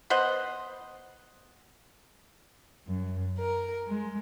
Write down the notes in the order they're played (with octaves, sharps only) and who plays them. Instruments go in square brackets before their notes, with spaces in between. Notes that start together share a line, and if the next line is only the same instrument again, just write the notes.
[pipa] B3 C5 D#5 F#5
[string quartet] F#2
A#4
G#3